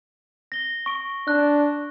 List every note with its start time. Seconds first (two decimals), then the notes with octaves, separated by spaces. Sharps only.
0.52 A#6 G7
0.86 C#6 D7
1.28 D4 F#6